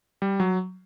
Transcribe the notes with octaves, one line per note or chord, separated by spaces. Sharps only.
G3
F#3